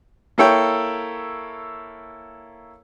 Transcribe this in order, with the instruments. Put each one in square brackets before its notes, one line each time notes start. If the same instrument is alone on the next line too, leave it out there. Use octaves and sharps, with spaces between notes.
[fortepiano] A#3 E4 A4 C#5 G5